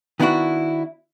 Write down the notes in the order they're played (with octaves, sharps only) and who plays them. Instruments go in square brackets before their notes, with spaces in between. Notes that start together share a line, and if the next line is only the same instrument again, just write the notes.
[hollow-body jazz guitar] D#3 B3 D4 E4 F#4